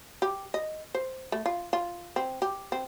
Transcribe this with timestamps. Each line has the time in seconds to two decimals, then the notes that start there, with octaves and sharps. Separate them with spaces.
0.22 G4
0.54 D#5
0.95 C5
1.32 A3
1.46 F4
1.73 F4
2.16 C4
2.42 G4
2.72 C4